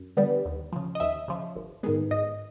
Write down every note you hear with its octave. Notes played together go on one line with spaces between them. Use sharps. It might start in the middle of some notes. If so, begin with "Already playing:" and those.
Already playing: F#2
D3 G3 B3
D#2
C#3 F3
D#5
D#2 E5
C#3 F3
G#1
G#2 D#3 G#3 B3
G#1 D#5